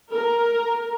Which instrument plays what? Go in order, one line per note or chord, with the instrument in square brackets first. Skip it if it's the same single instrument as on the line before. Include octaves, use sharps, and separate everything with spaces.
[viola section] A#4